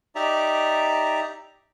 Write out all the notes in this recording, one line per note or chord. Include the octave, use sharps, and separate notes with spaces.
D#4 G4 D5 E5 A#5